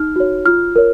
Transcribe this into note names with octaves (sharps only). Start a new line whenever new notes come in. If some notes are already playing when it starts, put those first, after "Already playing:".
Already playing: D#4 F6
F#4 C#5
F4 F6
A#4 C#5